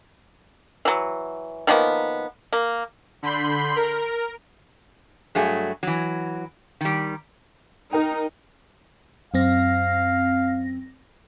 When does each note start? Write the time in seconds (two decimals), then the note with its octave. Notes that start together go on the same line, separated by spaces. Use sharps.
0.85 E3 F#3
1.67 D#3 F3 A#3 B3
2.53 A#3
3.23 D3 B5 C6 G6
3.76 A#4
5.35 G2 F#3 A3 G#4
5.83 E3 F#3
6.81 D#3 G3
7.93 D#4 A#4 G5
9.34 F#2 C4 F5 A#6